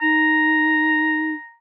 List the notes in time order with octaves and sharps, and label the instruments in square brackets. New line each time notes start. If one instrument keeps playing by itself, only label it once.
[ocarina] D#4 [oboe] A#5